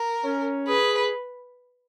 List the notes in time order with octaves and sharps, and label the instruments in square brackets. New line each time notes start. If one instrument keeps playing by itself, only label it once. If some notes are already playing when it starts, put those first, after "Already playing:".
Already playing: [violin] A#4
[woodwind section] C#4
[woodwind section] G#4 [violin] B4